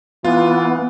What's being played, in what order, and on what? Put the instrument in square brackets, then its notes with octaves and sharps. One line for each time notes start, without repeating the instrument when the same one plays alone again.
[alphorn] E3 [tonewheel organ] B3 [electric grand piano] F4